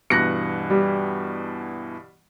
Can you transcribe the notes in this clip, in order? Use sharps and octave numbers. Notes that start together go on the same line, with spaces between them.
G2 B2 E3 F#6 A#6 C#7
G3